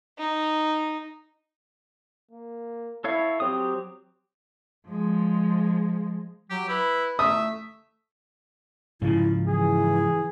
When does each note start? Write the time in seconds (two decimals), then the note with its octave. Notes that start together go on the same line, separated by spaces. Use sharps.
0.17 D#4
2.31 A#3
3.04 E4 A4 C#5 F5
3.40 F#3 C4 G4 D#6
4.88 F3 G#3
6.50 F#3 G4
6.69 E4 B4
7.19 A3 E5 D#6
9.02 G#2 C#3 F3 E4
9.48 E3 G#4